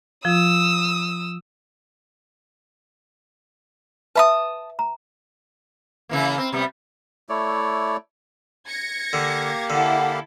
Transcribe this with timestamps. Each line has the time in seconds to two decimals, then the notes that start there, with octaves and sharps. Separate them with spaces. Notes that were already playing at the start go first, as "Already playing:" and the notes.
0.25 F3 F4 D#6 E6
4.15 B4 E5 A5 B5 D#6
4.79 A#5
6.09 C#3 E3 A#3
6.38 C4
6.52 C3 G3 B3
7.29 A3 E4 C#5 D5
8.67 G#6 A#6 C#7
9.13 D3 A#3 G4 F5
9.70 D3 E4 A4 F#5